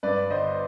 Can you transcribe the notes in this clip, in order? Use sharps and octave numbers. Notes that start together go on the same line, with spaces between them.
G2 B4 D5
G1 C5 D#5